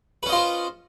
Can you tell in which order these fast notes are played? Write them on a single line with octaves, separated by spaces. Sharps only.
B4 C#4 D#5 F4 C5